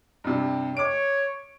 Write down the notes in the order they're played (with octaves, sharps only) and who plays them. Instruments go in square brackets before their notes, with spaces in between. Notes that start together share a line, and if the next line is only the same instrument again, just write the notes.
[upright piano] G2 C3
[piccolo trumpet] C#5 [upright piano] D6 D7